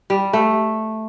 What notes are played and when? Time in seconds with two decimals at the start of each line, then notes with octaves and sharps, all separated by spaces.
0.10 G3
0.33 A3